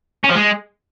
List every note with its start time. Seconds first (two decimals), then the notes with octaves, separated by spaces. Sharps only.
0.24 C#4
0.29 F3
0.35 G#3